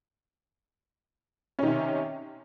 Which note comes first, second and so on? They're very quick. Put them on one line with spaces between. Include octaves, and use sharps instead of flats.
C#4 D#3 C3